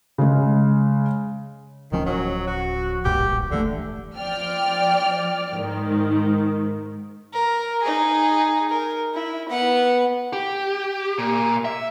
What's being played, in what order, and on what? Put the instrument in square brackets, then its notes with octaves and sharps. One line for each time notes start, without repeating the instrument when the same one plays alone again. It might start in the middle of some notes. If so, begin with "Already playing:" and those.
[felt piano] C#3 G#3
[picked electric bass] D1 F3 C#4 [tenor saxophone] D#3
[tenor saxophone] F#3
F#4
[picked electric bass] D1 A#1 G2 [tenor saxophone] G4
[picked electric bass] E1 E3 A3 [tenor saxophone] D3
[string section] F3 D5 G5 F6
G#2 D#3
[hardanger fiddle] A#4
D#4 G#4
A#4
E4
B3 F#5
[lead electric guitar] G4
A#2
E5